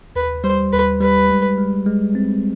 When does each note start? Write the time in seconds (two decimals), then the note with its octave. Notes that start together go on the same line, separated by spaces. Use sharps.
0.16 D#2 B4
0.44 G3 C5
0.72 D#2 B4
1.01 G3 B4
1.29 G#3
1.58 G#3
1.86 G#3
2.15 C4